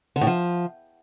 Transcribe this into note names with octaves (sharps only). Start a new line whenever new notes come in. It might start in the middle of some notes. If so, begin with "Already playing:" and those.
D3
A2
F3